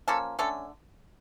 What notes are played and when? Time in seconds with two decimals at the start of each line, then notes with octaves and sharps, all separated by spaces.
0.08 F3 A#3 C#4 A4
0.39 D3 A3 C#4 A4